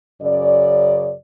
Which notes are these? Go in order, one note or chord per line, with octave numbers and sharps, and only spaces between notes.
F#2 C#3 D5